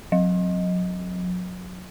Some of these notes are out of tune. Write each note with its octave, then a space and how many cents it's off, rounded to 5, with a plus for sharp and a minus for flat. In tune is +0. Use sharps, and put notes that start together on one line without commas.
F#3 -30